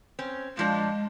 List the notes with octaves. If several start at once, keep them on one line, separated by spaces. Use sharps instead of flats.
C4 C#4
A#2 F3 G#3 D4